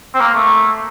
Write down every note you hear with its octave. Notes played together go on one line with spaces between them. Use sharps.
C4
A#3
A3